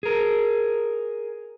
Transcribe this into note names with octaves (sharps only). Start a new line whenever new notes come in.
G#4 A#4